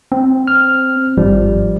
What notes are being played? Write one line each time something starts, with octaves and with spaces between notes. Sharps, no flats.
C4
F6
G#1 G2 F3 G3